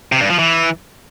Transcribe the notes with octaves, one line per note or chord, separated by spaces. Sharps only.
C3
G2
F3
E3